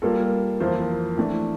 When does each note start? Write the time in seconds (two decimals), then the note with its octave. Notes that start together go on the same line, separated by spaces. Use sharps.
0.02 G3 A#3 F4 A4
0.60 F2 E3 A#3 F4 C5
1.17 E3 A3 D4